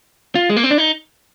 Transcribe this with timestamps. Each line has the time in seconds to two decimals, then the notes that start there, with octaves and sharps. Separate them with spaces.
0.35 F4
0.49 G#3
0.56 A#3
0.64 C4
0.71 D4
0.78 D#4